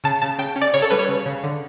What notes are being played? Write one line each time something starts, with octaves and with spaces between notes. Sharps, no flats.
C#3 A5
C#3 A5
C#3 G5
C#4
D5
C#3 C#5
A4
G3 B4
C#5
C#3
C#3
D3